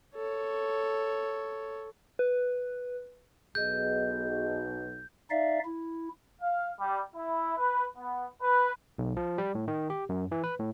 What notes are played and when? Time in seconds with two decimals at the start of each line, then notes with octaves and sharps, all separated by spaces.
0.15 A4 C#5
2.19 B4
3.55 B1 B2 G#4 D#5 G6
5.30 D#4 D5 E5 F5
5.65 E4
6.41 F5
6.79 G3
7.14 E4
7.57 B4
7.96 B3
8.41 B4
8.98 B1
9.17 F3
9.38 G3
9.55 A2
9.68 D#3
9.90 G4
10.09 F#2
10.32 E3
10.44 B4
10.60 A2